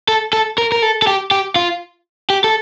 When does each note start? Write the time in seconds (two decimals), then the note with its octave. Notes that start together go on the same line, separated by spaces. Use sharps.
0.08 A4
0.33 A4
0.58 A#4
0.72 A#4
0.82 A4
1.02 A4
1.07 G4
1.31 G4
1.56 F4
2.30 G4
2.44 A4